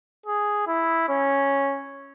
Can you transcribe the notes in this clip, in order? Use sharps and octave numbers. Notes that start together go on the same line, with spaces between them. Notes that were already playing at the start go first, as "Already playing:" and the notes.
G#4
E4
C#4